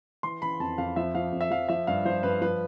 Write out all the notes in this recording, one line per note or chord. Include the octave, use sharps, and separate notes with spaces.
E3 C6
E3 B5
F2 A5
F2 F5
F3 E5
F3 F5
F2
E5
F3 F5
F3 E5
G2 F5
F3 C5
G2 B4
F3 B4